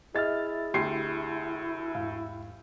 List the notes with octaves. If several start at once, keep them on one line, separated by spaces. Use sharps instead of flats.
E4 G#4 D#5 E5 F6 A6
D2 G4 C6 C7
E2 G#2 F5